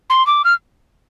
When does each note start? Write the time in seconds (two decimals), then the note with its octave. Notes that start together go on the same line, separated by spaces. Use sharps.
0.10 C6
0.27 D6
0.44 F6